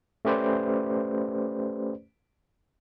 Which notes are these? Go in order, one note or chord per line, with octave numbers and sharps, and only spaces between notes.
A3 C#4 G4 B4 C5 D5